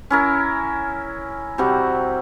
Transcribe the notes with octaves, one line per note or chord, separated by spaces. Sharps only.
C#4 E4 A#4
C3 G3 F#4